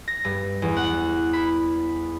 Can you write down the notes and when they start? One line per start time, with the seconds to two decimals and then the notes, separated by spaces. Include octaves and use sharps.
0.08 A#6
0.25 G2
0.62 E2
0.77 F#5
1.33 B5